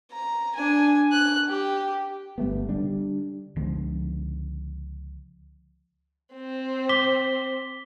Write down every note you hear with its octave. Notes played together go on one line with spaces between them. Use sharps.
A#5
D4 G#5
F#6
G4
G1 G3 A3 B3
D3 G3 D4
C#2 D3 F3
C4
D6 B6 G7